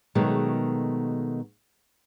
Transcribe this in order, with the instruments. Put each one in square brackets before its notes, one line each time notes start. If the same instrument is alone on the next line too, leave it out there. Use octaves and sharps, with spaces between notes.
[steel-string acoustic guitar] B2 D#3 F#3 G#3 A3